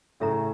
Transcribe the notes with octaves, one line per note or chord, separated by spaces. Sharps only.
A2 C#3 A4 C#5 E5 A#5